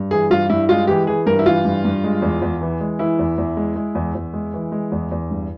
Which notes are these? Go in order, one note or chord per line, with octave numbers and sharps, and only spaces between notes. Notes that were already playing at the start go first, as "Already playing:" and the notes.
Already playing: G2
E3 G#4
G2 F4
G2 E4
G#3 F4
E3 G4
E3 G#4
G2 A#4
E4
E3 F4
G2
G2
G#3
E2
E2
E3
G#3
E3 E4
E2
E2
G#3
G#3
E2
E2
G#3
E3
G#3
E2
E2
G2